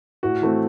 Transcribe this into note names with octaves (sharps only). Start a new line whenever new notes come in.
A2 F#4
E3 A3 C4